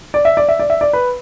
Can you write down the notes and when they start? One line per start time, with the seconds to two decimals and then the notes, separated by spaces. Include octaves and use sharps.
0.14 D5
0.25 E5
0.37 D5
0.49 E5
0.59 D5
0.70 E5
0.81 D5
0.93 B4